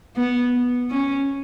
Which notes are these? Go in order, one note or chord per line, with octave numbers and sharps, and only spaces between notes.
B3
C#4